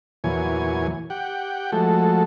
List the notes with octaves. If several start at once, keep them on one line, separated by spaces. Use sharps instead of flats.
E2 A#2 E3 F#3 C#5 G#5
G4 F#5 G5
F3 G#3 A3 F#4 A4